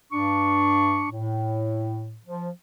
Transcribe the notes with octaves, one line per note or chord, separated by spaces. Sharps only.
G2 D4 C#6
A2
F3